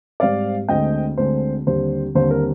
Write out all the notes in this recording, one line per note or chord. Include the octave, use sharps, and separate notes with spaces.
G#2 G3 C4 D5 F5
D2 D3 G#3 C4 D#5 G5
D2 D3 G#3 C4 C5
D#2 D3 G3 C4 C5
D#2 D3 G3 C4 C5
A#4